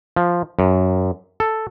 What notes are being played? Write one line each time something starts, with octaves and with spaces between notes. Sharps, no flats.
F3
F#2
A4